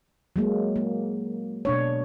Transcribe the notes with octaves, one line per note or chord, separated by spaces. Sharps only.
F#3 G#3 A#3
A#3
B2 D4 C#5